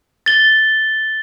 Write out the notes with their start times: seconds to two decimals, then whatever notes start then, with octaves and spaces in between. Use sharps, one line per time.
0.26 A6 G7